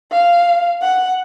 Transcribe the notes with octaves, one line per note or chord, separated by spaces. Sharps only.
F5
F#5